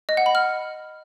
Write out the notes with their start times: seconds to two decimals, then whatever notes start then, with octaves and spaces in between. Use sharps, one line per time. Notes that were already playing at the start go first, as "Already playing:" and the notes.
0.09 D#5
0.17 F#5
0.26 B5
0.35 F6